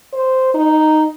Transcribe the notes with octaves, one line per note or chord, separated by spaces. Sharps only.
C5
D#4